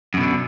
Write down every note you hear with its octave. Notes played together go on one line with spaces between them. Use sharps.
F#2 B2 D3